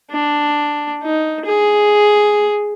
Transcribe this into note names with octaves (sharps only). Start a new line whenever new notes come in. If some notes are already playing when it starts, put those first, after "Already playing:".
D4
D#4
G#4